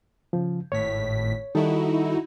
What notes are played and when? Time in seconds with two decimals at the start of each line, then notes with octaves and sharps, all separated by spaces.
0.33 C#3 F3
0.72 G#1 A2 C#5 B6
1.55 D#3 G3 D#4 E4 F#4 A4